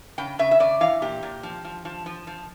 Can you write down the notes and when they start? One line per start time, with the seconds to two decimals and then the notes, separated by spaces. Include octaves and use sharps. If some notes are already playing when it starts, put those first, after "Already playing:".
0.18 C#3 G5
0.39 C#3 E5
0.51 E5
0.60 C#3 D5
0.81 E3 F5
1.02 A#2 G4
1.23 A#2
1.43 F3
1.64 F3
1.85 F3
2.06 F3
2.27 F3